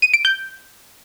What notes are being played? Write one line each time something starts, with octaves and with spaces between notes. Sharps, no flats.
D#7
D7
G6